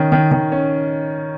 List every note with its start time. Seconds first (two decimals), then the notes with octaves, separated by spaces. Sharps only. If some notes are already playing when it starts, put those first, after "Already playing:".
Already playing: D#3 C#4
0.12 D#3
0.32 D#3
0.52 C#4